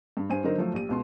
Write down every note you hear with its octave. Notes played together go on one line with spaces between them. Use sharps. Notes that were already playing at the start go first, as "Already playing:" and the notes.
G2
G2 C5 G#5 D#7
D3 F#3 D#4 A#4 C5
F3 F#3 A3 C5
A#1 G4 D#7
C#2 B2 C6